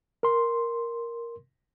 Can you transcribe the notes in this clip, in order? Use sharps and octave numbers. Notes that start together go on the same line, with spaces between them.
A#4 C6